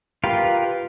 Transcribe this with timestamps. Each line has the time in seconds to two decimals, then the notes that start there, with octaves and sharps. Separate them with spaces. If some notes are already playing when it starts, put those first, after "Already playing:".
0.24 F4 G4 A#4 B4 F5